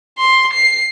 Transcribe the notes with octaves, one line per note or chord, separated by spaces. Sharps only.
C6
C7